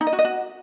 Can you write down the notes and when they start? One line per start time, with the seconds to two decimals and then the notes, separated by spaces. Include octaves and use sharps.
0.01 D#4
0.07 D#5
0.13 F#4
0.19 D#5
0.25 F#4